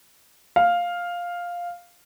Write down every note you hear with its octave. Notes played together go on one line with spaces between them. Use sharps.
F5